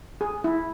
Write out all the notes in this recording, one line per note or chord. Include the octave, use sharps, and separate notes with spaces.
G#4
E4